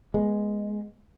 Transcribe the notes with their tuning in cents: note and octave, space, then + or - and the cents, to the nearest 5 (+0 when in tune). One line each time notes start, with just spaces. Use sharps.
G#3 +0 B3 -25